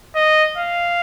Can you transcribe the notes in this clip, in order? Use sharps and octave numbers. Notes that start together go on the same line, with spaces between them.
D#5
F5